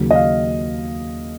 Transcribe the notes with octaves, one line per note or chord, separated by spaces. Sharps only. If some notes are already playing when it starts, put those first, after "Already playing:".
Already playing: D#2 C#3 F#3
D#5
F5